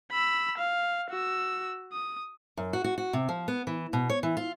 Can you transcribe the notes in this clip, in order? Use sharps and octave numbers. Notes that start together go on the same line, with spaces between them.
B5 E6
F5
F#4 E6
D#6
F#2
F#4
F#4
F#4
C3
F3
B3
E3
B2
C#5
E3
F4